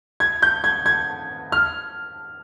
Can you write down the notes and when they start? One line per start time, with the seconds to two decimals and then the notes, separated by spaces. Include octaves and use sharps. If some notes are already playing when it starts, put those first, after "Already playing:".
0.20 G#6
0.42 G6
0.64 G#6
0.86 G#6
1.52 F6